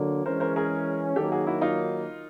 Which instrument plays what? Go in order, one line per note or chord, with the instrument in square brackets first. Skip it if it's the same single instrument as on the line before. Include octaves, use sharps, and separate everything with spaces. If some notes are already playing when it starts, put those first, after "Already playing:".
Already playing: [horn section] D3 F#3 A#3
[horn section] E3 G#3 C#4 [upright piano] A#4 C5
[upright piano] A#4 C5
G#4 A#4
[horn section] D#3 F#3 A#3 [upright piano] G4 A4
[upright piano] F#4 G#4
E4 F#4
D#4 F4